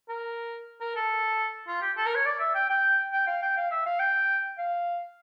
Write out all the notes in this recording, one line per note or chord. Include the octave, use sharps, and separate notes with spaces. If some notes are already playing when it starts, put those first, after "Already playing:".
A#4
A#4
A4
F4
G4
A4
A#4
C#5
D5
E5
G5
G5
G5
F5
G5
F5
E5
F5
G5
F5